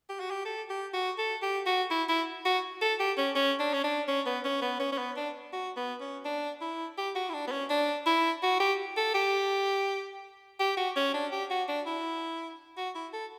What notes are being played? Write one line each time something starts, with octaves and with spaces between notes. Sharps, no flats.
G4
F#4
G4
A4
G4
F#4
A4
G4
F#4
E4
E4
F#4
A4
G4
C#4
C#4
D4
C#4
D4
C#4
B3
C#4
B3
C#4
C#4
B3
D4
F#4
B3
C#4
D4
E4
G4
F#4
E4
D4
B3
C#4
D4
E4
F#4
G4
A4
G4
G4
F#4
C#4
D4
G4
F#4
D4
E4
F#4
E4
A4